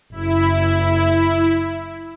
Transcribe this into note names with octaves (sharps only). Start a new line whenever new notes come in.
F#1 E4